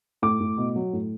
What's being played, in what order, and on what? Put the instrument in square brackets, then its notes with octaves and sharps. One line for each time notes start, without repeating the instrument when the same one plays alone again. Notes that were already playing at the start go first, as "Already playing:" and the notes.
[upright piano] A2 D6
A2
B2
F#3
A2